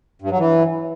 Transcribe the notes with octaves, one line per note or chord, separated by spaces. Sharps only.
G2
F#3
E3